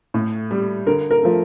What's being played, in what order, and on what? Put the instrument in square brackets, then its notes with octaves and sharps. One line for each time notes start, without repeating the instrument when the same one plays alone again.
[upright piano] A2
G3
D3 A#4
A#4
F3 A3